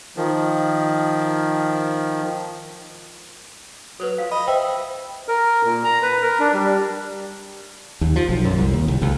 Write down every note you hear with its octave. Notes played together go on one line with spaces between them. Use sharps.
D#3 F3
F#3 A4 B4
F3 F5
D#5 B5
C5 E5 G5
A#4
A#2
A#5
B4
A#4
D4
G3
D#2
F3
B1
F#2
C2
D#2
C2
C#2